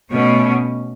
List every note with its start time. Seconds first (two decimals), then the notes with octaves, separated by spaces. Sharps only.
0.12 B2 A3 C#4